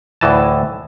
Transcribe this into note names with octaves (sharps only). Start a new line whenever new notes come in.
D2 A2 E3 D#5 A5